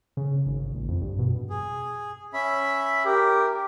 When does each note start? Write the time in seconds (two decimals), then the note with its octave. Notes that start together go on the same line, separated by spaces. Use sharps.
0.17 C#3
0.46 G#1
0.74 A#1
0.88 F2
1.01 G2
1.19 B2
1.50 G#4
2.33 C#4 E5 B5
3.06 G4 A#4